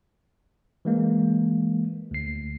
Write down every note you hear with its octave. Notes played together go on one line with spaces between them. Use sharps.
E3 G#3 A#3
D2 C7